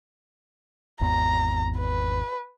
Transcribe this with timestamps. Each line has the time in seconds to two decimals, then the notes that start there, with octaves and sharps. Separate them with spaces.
1.01 G#1 E2 B3 A#5
1.79 B4